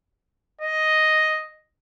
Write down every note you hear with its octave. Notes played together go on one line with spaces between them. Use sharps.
D#5